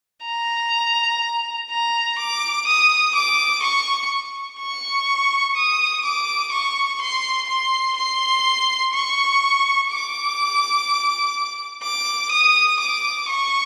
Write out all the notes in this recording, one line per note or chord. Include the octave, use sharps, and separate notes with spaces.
A#5
A#5
D6
D#6
D6
C#6
C#6
D#6
D6
C#6
C6
C6
C6
C#6
D6
D6
D#6
D6
C#6